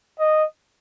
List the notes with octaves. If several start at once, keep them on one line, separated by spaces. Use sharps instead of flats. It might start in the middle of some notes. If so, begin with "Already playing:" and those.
D#5